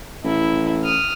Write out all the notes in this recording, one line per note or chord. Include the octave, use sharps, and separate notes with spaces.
A1 E4
D#6 F6